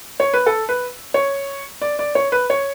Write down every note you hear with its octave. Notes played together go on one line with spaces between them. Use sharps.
C#5
B4
A4
B4
C#5
D5
D5
C#5
B4
C#5